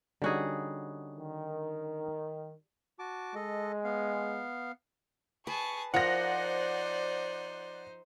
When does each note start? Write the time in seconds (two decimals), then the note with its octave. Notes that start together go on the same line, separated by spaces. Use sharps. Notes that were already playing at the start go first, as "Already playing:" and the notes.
0.22 D3 G3 C#4 D#4 F#4 G#4
1.18 D#3
2.99 F#4 A5 D6
3.35 G#3 A4 D#5
3.84 B3 F5
5.47 G#4 B4 A5 C#6
5.94 F3 D#4 A#4 C5 D5 F#5 A#6